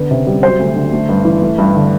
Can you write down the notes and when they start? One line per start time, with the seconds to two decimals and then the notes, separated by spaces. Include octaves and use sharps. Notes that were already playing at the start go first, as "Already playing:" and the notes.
Already playing: D3 B3
0.11 C3
0.27 G3
0.43 F#3 C5
0.59 D2
0.76 D3
0.93 A3
1.09 G2
1.25 E3
1.42 A3
1.58 G2
1.75 D3